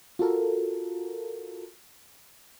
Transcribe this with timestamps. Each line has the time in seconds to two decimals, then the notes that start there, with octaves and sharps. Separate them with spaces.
0.19 F4 F#4 A4 A#4